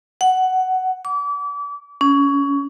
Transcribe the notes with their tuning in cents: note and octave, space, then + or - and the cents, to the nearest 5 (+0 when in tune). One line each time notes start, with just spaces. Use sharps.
F#5 +10
D6 -35
C#4 +20